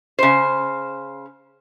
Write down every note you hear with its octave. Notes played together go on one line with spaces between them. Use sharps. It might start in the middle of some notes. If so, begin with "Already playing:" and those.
C#3 C5